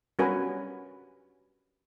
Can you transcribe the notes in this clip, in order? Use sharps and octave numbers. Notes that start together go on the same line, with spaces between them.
G3 C#4 F#4 A#4 B4 G#5